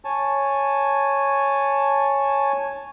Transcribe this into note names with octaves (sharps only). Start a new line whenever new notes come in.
C#5 G#5 A5